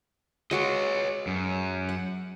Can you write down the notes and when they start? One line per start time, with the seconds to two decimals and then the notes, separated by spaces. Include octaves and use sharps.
0.51 G#3 F#4 G#4 C#5 D#5
1.27 F#2
1.89 F#5